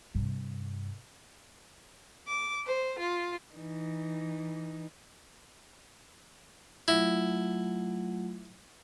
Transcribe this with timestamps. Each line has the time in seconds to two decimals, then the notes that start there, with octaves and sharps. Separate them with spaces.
0.15 G2 C3
2.28 D6
2.66 C5
2.99 F4
3.54 E3 D#4
6.88 F#3 A3 E4 F4